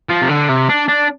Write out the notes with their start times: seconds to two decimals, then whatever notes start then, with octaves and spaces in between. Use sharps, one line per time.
0.09 F3
0.22 C3
0.29 D3
0.49 C3
0.70 D4
0.88 D4